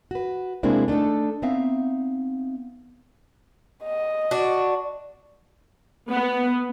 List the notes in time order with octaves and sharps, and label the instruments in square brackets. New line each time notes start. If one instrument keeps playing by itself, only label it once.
[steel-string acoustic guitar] F#4 B4
C3 G#3 A#3 C4 D4 E4
A3 D4 D#4 A4
B3 C4 D#4 E5 F5
[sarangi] D#5
[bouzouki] D4 F#4
[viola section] B3